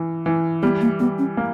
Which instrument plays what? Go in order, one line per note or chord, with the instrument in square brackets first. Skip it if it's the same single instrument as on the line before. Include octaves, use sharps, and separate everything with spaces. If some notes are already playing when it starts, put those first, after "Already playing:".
Already playing: [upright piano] E3
E3
[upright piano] G3 [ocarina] B3
[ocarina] A#3
[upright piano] G3 [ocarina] B3
[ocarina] C#4
[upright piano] A#3